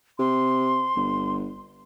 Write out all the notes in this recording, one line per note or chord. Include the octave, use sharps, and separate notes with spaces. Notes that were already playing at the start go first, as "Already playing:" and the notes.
C3 C6
G1